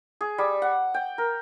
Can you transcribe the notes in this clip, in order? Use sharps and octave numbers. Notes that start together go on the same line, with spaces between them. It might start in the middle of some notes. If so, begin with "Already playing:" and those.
G#4
G3
F#5
G5
A#4